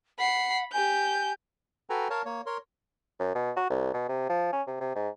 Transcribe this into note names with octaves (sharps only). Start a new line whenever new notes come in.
F#5 B5 C7
G4 G#5 G6
F#4 A4 B4 G5 G#5 A#5
A#4 C#5 F5 A5
A#3 C#5
A#4 C#5 C6
F#2
B2
F#4
C2
B2
C3
F3
C#4
C3
C3
G#2